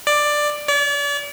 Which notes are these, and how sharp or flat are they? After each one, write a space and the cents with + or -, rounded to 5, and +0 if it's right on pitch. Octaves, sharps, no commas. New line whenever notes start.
D5 +10
D5 -40